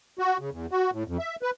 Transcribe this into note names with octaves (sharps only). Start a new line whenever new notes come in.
F#4
C#3
E2
F#4
A2
F2
E5
B4